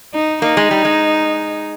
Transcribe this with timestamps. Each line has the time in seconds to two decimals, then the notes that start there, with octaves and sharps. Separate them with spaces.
0.14 D#4
0.42 A#3 D#4
0.57 G#3
0.71 G3
0.85 G#3